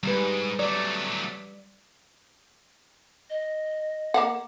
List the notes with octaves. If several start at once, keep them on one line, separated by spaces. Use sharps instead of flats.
C#2 G#2 G3 B4
F#3 A3 D5
D#5
A#3 F5 F#5